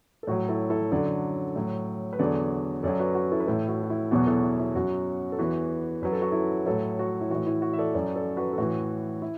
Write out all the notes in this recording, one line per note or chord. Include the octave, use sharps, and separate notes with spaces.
A4
A2 F#3 F#4
E4 A4
E4 A4
F#2 D3 F#3 A4 D5
A2 F#3
B4
E2 D3 F#3 A4 D5
F#2 F#3 A4 D5
F#4 B4
F#4
E4 A4
B4
A2 E3 E4 A4
F#4
F#4
E4
E2 B2 F#3 F#4
E4 A4
E4
E4
F#2 F#3 F#4
A4
E2 E3 F#4 B4
F#2 F#3 B4
A4
F#4
E4 A4
A2 F#3 E4 A4
F#4
E4
A2 E3 F#4
E4
F#4
E5
A4 D5
F#2 F#3 A4 D5
A4 D5
F#4 B4
A4
A2 E3 F#4
E4